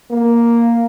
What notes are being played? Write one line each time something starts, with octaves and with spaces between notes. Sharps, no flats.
A#3